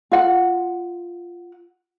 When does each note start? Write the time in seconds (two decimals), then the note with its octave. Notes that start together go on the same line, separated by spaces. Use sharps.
0.12 F4 F#5